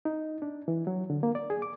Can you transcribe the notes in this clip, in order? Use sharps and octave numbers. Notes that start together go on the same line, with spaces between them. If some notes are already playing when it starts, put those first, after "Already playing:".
D#4
D4
E3
F#3
D3
A#3
D5
G#4
D6